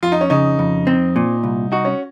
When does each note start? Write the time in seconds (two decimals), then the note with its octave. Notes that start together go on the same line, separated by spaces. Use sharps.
0.03 F2 F4
0.12 D#4
0.21 C#4
0.30 C#3 D#4
0.59 F2
0.87 C4
1.16 A#2
1.43 C2
1.72 D#4 F#4
1.85 C#4